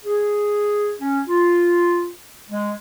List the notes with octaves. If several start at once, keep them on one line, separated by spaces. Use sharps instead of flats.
G#4
C#4
F4
G#3